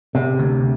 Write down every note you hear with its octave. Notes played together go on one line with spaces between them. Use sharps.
C3
D2